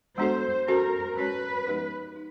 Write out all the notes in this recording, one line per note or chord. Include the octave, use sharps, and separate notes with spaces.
G#3 B3 D4 F#4 A4 C5
C#4 F#4 A4 A#4 C5
G#3 C#4 F#4 A4 B4 C#5
F3 G#3 B3 D#4 G4
D#4